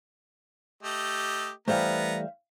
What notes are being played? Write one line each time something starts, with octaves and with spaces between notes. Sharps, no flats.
A3 G4 D#5
E3 G3 A3 B3 C5 E5 F5 A#5